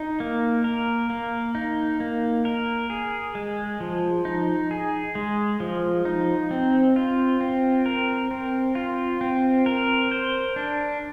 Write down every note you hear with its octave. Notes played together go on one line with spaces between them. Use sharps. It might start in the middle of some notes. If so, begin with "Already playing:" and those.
Already playing: D#4
A#3
A#4
A#3
D#4
A#3
A#4
G#4
G#3
F3
D#4
G#4
G#3
F3
D#4
C4
F4
C4
A#4
C4
F4
C4
A#4
C5
D4